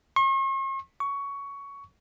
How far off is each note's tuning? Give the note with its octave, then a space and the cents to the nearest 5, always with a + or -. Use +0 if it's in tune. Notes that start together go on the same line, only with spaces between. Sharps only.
C#6 -45
C#6 +15